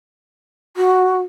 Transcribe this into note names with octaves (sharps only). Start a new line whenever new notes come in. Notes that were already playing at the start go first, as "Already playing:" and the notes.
F#4